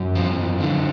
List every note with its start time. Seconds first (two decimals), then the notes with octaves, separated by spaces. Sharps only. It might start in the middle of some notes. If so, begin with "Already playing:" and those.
Already playing: F#2
0.15 F3
0.60 D3